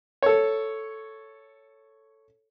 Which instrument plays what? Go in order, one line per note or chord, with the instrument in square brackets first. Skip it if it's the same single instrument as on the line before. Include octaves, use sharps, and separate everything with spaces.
[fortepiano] A4 C#5